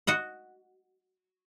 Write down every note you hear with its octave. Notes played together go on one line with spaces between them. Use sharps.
F#4 D#5 F#5